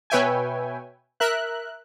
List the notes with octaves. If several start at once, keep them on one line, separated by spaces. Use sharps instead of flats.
B2 B4 C#5 E5 G5 G#5
A#4 E5 F#6